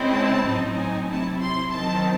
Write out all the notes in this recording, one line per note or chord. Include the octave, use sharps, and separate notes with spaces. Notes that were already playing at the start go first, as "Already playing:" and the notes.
Already playing: C#3 G#3 C4 E4
A5
A2 F#3 C4 D#4
G#5
C3 F#3 C4 E4 A5
C6
D#3 F#3 C4 A5